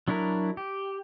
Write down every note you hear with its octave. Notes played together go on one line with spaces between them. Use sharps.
F#3 D4 E4 A#4
G4